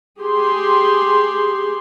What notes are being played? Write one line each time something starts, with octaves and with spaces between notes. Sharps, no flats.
G4 G#4 C6